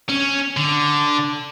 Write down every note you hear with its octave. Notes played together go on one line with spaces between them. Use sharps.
C#4
D3